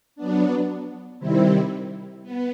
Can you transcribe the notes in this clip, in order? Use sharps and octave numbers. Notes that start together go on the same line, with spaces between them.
F#3 B3 D4
C3 D#3 G3 C4 E4
B3